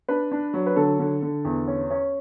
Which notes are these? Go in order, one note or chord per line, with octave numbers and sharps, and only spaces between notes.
D4 B4
D4
F#3
B4
D3 A4
D3
D3
E2
C#4
C#4